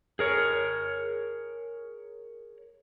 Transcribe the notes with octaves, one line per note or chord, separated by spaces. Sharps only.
G#4 A#4 C#5